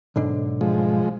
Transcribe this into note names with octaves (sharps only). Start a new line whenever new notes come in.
B1 G#2 D3
F3 G#3